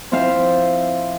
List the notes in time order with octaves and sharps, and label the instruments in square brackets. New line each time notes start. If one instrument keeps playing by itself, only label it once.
[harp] F3 C4 E4 E5 F5